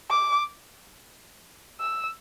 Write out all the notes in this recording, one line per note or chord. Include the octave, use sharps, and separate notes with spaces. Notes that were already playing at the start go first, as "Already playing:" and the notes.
D6
E6